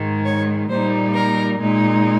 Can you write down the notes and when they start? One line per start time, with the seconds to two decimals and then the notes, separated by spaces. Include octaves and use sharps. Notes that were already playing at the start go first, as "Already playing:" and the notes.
Already playing: G#2 D#3 G#3
0.25 C#5
0.69 A#2 G3 A#3 D#4 C5
1.14 A#4
1.58 A#2 G#3 D#4